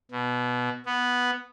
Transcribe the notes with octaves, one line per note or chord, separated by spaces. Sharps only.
B2
B3